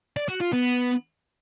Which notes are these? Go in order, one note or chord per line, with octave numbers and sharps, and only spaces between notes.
D5
F#4
F4
B3